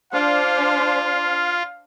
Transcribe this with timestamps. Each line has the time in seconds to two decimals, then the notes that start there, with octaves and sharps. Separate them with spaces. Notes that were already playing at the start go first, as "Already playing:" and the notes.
0.13 D4 F4 C5 D5 F5